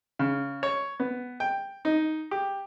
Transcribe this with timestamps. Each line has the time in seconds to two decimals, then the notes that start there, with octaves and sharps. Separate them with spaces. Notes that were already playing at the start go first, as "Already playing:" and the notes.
0.19 C#3
0.63 C#5
1.00 B3
1.40 G5
1.85 D#4
2.31 G4